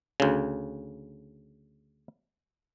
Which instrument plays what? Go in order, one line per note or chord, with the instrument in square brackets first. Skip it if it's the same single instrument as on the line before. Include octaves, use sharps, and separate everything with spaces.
[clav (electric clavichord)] D2 C#3